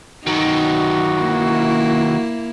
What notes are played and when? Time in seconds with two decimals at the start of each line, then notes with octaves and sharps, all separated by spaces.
0.27 D#3 F#3 D#4 F#4
1.21 A#3 E4